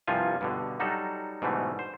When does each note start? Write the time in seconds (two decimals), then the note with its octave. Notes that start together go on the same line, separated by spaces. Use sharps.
0.07 C2 G2 F3 G3 F4 G#5
0.41 G2 B2 D3
0.80 F#3 G3 D#4 F#4 A4
1.42 G#2 B2 D3 E3 G3 A3
1.79 C5